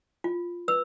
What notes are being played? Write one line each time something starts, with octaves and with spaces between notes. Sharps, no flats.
F4
B4 E6